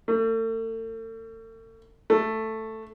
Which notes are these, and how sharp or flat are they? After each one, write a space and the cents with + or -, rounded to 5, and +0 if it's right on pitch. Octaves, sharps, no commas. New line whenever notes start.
A3 +40
A3 +5